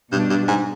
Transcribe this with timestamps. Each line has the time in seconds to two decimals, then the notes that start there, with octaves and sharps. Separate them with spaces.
0.12 G2 B2 G3 D4
0.30 G2
0.48 G#2